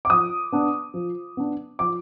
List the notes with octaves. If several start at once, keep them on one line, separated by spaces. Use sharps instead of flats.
D6
F3 D#6
B3 D4
F3
B3 D4
F3 D6